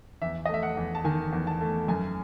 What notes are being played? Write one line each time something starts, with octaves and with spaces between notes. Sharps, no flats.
E2 E5
A3 D#5
E5
F#5
E2
A5
D#3 G#5
E2
A5
A3
F#2 G#5